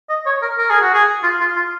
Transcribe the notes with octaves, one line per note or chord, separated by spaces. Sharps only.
D#5
C#5
A#4
A#4
G#4
F#4
G#4
F4
F4
F4